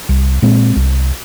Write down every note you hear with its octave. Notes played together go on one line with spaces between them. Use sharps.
C2
A#2 G#3 C4
C2